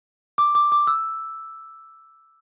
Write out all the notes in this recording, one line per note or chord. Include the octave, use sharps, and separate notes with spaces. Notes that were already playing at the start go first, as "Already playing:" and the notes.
D6
D6
D6
E6